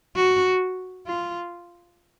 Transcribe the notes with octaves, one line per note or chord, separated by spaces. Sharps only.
F#4
F4